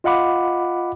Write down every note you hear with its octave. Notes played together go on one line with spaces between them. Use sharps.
F4 D#5 F5 F#5 B5 D6